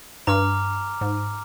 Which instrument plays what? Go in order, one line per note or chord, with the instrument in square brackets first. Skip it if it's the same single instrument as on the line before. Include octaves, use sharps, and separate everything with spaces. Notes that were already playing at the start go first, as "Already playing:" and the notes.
[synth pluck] G2 [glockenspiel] A#5 D6 F6
[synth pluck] G#2